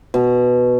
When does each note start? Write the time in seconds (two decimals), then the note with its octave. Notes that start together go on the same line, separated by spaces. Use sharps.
0.14 B2